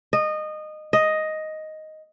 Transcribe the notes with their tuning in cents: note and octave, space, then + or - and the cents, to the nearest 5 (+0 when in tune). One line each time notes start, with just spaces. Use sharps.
D#5 -20
D#5 +5